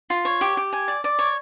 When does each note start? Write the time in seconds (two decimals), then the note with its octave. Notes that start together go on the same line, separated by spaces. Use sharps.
0.10 F4
0.25 C#5
0.41 G4
0.57 G4
0.73 G#5
0.88 D5
1.04 D5
1.19 C#5